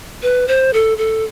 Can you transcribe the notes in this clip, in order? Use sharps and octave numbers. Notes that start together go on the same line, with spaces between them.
B4
C5
A4
A4